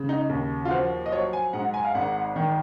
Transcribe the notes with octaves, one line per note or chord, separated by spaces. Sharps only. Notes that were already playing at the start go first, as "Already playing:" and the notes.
Already playing: C#3 G#3
D#4
D#2
F4
F3 F#4
D#5
F#3 C#5
G#5
G#2 F#5
G#5
F5
G#1 F#5
D#3